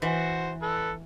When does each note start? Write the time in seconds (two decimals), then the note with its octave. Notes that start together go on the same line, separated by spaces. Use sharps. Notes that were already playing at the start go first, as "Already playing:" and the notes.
0.02 E3 F#4 C5
0.62 A4 B4